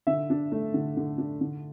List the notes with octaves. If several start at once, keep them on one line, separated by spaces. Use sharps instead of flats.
D3 E5
D4
A3
D3
D3
D4
D3